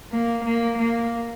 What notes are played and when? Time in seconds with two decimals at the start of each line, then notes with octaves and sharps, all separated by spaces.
0.12 A#3
0.45 A#3
0.78 A#3